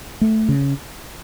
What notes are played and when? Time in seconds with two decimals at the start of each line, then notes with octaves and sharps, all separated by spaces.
0.21 A3
0.49 C#3